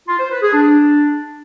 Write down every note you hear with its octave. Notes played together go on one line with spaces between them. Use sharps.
F4
C5
B4
G#4
D4